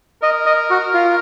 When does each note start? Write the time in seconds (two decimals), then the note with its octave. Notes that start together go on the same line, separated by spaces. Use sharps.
0.22 A#4 D#5
0.46 D#5
0.70 F#4
0.94 F4